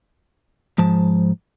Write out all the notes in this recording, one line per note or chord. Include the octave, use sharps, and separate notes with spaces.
G#2 F3 A5